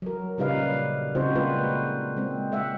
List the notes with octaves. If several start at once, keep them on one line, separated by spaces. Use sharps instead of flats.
F#3 A#4
A#2 C#3 G3 D#4 B4 F5
C#3 G3 C4 D#4 F#4 C5
G#3 A#3 F4 B4
G#3 C4
G#3 E5 F#5